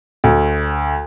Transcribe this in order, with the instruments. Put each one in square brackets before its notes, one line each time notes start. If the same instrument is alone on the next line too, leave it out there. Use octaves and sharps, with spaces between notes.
[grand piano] D2